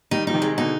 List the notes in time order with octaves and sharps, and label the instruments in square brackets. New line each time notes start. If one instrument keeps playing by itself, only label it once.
[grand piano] D#3 G3 [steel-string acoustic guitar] D#4
[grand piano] F3 [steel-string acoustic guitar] D#4
[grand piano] C3 D#3
[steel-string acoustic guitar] G#3
[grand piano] B2 D3 [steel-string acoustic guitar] D#4